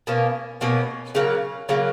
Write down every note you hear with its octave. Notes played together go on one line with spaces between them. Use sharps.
B2 A#3 C#4
B2 A#3 C#4
C#3 F#3 A#3
C#3 F#3 A#3